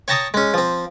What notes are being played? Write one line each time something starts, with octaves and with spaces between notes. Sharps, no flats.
C#5 G5 A5 A#5 C#6 D#6
G#3 C#4
F3 C4